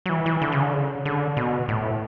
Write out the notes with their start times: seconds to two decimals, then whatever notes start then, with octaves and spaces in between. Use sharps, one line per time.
0.06 F#3
0.09 E3
0.26 E3
0.42 D3
0.52 C#3
0.62 D3
0.73 C#3
1.05 D3
1.37 B2
1.69 A2